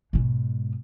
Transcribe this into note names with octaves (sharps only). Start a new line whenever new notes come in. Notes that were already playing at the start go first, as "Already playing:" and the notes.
G#2 B2